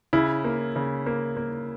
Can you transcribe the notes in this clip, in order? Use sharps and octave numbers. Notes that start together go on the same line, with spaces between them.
C#3 E4
A#3
C#3
A#3
A#3